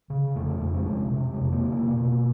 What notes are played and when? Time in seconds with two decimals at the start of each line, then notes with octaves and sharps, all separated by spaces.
0.10 C#3
0.35 F2 A3
0.61 F2
0.74 G#3
0.87 C3
1.13 C3
1.33 G#3
1.40 F2
1.52 A#3
1.65 C3
1.72 A#3
1.91 B2